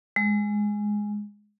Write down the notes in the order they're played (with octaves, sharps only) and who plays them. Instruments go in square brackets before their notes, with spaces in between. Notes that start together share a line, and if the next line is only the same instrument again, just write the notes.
[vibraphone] G#3